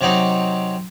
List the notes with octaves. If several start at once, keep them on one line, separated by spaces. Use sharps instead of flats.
C3 F#3 C4 D#4